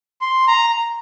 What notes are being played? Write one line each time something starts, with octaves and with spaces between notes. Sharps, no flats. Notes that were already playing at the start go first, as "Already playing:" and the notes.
C6
A#5